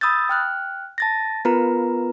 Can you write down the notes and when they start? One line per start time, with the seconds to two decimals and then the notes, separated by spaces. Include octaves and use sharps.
0.01 B5 D#6 E6 G6 A6
0.29 G5 F6 F#6
0.98 A5 A6 A#6
1.45 B3 F4 A#4 B4 A#5